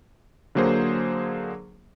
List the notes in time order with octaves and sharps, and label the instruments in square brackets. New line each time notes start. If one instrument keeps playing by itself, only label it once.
[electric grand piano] D3 F#3 A#3 G#4 C5